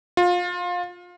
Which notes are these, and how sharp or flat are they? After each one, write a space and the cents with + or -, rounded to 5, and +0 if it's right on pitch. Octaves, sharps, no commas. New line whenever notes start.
F4 +25